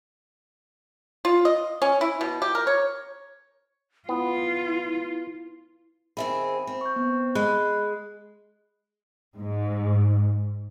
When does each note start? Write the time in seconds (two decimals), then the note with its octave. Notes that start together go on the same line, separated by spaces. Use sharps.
1.25 F4
1.45 D#5
1.82 C#4
2.01 E4
2.21 B2
2.42 G4
2.55 A#4
2.67 C#5
4.09 B3 E4 F4
6.17 D#3 C4 G#4 E5 B5
6.67 C4
6.81 C#6 G6
6.96 B3
7.35 G#3 D#5 B5 F#6
9.38 G#2